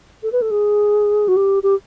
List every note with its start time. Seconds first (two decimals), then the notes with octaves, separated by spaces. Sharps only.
0.23 A4
0.32 B4
0.42 A4
0.51 G#4
1.28 F#4
1.36 G4
1.63 G4